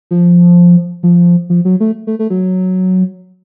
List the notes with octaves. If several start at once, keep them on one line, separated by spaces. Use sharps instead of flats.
F3
F3
F3
F#3
A3
A3
A3
F#3